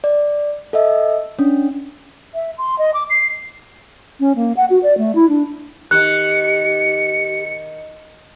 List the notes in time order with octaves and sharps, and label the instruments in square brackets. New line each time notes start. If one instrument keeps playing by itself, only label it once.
[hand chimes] D5
A4 D#5 E5
C#4 D4
[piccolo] E5
C6
D#5
D6
C7
[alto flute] C#4
A#3
F#5
F#4
D5
A3
E4
D4
[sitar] D#3 [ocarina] G4 [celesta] F#6 [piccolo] C#7